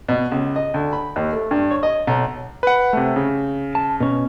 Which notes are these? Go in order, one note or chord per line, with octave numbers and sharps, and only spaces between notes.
B2
C#2
D#5
D2
B5
D#2
A3
G2
C#5
D#5
B1
B4 F#5
C3 A3
C#3
A5
B2 C#4